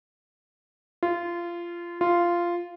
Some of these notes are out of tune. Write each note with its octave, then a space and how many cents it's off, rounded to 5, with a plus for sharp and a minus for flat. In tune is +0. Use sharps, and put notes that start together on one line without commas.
F4 -20
F4 -10